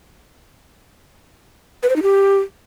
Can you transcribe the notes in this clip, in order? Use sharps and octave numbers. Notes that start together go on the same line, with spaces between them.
B4
C5
D#4
G4